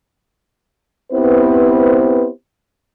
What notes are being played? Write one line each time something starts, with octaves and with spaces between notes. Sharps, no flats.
B3 C4 E4 G4 B4 C5